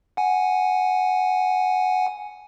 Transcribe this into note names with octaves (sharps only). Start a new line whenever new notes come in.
F#5 G#5